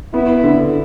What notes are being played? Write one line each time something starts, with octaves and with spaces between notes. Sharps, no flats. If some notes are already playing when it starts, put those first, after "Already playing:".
B3 E4
D3